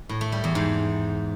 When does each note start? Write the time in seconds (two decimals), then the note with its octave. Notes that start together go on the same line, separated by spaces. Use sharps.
0.09 A2
0.21 A3
0.32 G3
0.44 E2
0.55 G#2